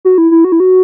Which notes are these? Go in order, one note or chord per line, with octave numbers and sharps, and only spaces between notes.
F#4
E4
E4
F#4
E4
F#4